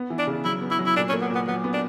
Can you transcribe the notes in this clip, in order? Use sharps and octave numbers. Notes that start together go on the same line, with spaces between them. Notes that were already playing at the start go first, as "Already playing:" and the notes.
Already playing: B3
E3
D4
C#3
F#3 E4
B3
E4
F#3
E4
A#2 D4
C#4
A#3
B3
A#2
B3
F#3 B3
B3
D4